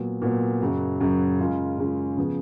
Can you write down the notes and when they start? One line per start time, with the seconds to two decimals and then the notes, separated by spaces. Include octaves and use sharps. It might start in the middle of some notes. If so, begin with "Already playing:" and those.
Already playing: A#2 F#3 B3
0.22 A#2 F#3 B3
0.61 F#2 C#3 F#3
1.01 F#2 C#3 F#3
1.39 C#3 G#3 C#4 F4
1.78 C#3 G#3 C#4 F4
2.17 C#3 F3 B3